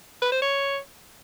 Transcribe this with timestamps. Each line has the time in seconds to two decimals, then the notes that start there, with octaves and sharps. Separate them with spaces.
0.22 B4
0.32 C5
0.42 C#5